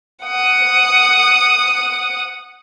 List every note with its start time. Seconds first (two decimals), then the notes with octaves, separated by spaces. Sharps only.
0.24 F#5 D#6